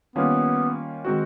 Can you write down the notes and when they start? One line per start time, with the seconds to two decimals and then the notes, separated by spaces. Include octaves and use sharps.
0.16 D#3 G3 A#3 B3 C#4 F4
1.05 D#3 G#3 C4 D#4 F#4